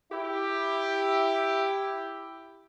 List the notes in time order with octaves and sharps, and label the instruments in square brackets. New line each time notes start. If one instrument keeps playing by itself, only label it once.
[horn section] E4 G4